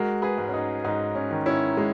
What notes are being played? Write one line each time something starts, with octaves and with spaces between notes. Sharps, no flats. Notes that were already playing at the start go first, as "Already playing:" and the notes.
Already playing: G#3 F#4 A#4
G#4 B4
G#2
C#4
D#4
G#2 D#4
C#4
D#3
C#4 E4
G#3